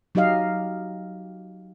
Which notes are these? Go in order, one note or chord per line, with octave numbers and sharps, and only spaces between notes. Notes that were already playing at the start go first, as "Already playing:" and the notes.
F#3 D#4 G4 D#5 F5